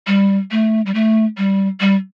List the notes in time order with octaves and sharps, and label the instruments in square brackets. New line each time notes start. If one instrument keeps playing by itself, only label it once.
[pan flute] G3
A3
G3
A3
G3
G3